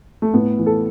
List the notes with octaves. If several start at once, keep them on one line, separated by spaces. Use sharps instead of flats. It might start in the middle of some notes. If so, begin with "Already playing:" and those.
A3
A2 B3
E3
A4